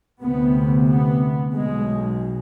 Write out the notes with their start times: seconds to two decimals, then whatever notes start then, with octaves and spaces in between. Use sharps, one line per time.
0.22 D2 C3 B3
0.89 B3
1.54 B1 B2 G#3